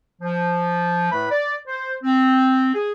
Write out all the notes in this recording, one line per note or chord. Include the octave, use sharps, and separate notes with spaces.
F3
A2 A3 B4 B5
D5
C5
C4
G#4